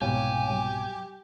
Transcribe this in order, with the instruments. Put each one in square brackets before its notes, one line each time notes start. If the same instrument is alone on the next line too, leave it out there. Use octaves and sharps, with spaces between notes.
[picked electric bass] C2 G#2 B2 [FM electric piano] B3 C#5 F5 [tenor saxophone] G4 [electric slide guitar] G#5
[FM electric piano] F#3 G3